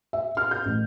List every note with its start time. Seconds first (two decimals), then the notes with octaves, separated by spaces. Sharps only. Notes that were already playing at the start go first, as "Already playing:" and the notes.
0.13 E5
0.37 F6
0.51 G6
0.65 A1